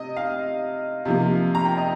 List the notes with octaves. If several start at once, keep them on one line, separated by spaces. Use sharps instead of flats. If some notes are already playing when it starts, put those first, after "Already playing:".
Already playing: C3 D#5
F5
C3 F3 A#3
A#5
G5
D#5